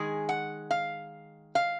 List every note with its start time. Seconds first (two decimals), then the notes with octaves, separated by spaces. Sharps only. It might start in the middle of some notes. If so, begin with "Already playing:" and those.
Already playing: D#3 G#3 G#4
0.29 F#5
0.71 F5
1.55 F5